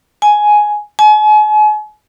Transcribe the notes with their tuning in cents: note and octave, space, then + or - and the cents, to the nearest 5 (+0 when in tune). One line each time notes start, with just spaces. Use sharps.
G#5 +10
G#5 +40